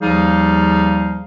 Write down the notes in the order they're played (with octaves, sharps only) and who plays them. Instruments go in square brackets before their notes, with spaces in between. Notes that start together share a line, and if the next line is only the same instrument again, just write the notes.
[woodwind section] D#2 F3 G3 D#4 G#4 F5